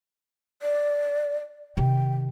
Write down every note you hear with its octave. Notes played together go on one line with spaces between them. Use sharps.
D5
C3 D#3 G5